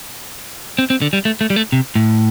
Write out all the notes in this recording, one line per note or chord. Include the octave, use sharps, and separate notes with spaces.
C4
C4
D3
G3
A3
A3
G3
A3
C3
A2